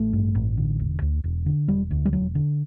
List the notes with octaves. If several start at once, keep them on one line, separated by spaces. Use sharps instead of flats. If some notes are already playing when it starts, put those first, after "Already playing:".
Already playing: A1 A3
G2
A1
D3
E1
D2
E1
D3
E1 G3
D2
G3
E1 F#3
D3